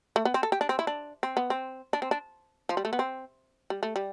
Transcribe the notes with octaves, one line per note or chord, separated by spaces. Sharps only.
A3
B3
C4
A4
G4
D4
C4
E4
D4
C4
B3
C4
D4
C4
D4
F3
G3
A3
B3
C4
G3
A3
G3